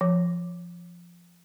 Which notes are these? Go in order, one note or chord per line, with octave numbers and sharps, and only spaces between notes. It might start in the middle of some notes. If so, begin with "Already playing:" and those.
F3